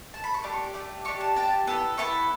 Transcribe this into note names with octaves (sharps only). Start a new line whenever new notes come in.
A5
B5
C#6
A3 D4 G4 D6
C#6
D6
A3 D4 G4
D4 G4 C#6
A5
D4 G4 A5
B3 E4 A4
B3 E4 A4 C#6